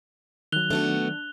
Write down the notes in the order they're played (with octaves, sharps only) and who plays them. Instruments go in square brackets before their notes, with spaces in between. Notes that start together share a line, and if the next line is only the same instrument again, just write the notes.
[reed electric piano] D#3 F#3 [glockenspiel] F#6 F7 G7
[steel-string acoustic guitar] A3 B3 F#4 [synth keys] D4